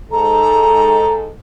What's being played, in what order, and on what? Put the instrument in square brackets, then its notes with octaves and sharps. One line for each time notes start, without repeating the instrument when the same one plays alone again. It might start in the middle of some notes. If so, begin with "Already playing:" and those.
[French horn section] G#2 A4 [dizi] A#5